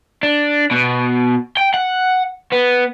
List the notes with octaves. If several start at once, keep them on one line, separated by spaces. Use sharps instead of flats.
D4
B2
G5
F#5
B3